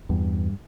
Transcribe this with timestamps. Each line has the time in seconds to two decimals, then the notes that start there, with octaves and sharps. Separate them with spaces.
0.09 E2 G2